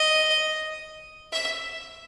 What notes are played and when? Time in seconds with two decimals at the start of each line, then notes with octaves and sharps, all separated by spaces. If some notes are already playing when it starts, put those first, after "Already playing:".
Already playing: D#5
1.32 E5